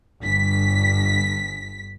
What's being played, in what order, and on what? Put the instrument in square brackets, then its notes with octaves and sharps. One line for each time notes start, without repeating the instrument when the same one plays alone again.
[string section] G1 B6